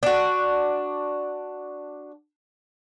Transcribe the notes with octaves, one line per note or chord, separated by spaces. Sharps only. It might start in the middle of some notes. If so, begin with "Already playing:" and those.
D4 F#4